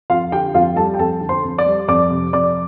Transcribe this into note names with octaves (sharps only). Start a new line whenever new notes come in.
F2 F4 F5
D3 G4 G5
F2 F4 F5
G3 A4 A5
G5
F2 A4 A5
D3
C5 C6
F2
D5 D6
G3
F2 D5 D6
C3
F2 D5 D6